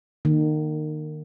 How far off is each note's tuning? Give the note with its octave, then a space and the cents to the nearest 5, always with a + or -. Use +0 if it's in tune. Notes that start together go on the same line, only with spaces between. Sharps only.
D#3 -25 A#3 +0